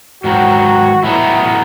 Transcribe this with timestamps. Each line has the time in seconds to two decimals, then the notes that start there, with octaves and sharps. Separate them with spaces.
0.24 G#2 D#3 F#3 F#4
1.03 A2 F#3 B3 D#4 E4